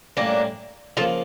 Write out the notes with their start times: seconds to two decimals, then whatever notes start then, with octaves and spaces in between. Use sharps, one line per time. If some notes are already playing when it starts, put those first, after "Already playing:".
0.17 A2 G3 A#3 C#4 D4
0.97 C#3 F3 A#3 F4 A4